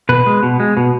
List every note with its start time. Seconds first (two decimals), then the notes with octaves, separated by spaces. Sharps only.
0.09 B2 B4
0.26 G#3
0.43 B2
0.60 G#3
0.77 B2